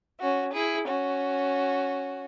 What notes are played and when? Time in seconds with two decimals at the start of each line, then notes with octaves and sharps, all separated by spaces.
0.21 C#4 F#4
0.54 E4 G#4
0.87 C#4 F#4